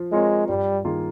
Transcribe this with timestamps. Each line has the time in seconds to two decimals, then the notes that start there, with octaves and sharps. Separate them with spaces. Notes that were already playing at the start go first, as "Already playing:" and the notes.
Already playing: F3 F4
0.12 G#3 C4 F4 A#4 C#5
0.48 G2 G3
0.84 D#3 A#3 F4 G#4